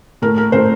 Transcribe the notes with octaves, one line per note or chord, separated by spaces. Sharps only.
A2 A3 A#4
A#4
A2 A3 C5